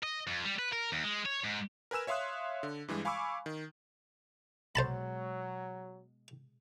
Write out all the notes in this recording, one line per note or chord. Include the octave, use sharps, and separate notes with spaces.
D#5
F2
G3
B4
A#4
D#2
G#3
C#5
G#2
A#4 B4 G#5 E6 E7
C#5 E5 F5 C6 D#6 F#6
D3
G2 E3 G3 G#3
F5 G#5 B5 C#6 D6 E6
D#3
B2 F#3 G#3 C5 A5 B5